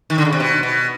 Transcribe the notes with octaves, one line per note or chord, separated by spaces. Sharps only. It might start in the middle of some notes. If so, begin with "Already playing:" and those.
D#3
D3
C#3
C3
B2
B2